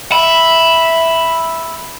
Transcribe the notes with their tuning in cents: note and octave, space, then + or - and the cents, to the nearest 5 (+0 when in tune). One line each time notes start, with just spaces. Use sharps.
E5 +0 B5 +0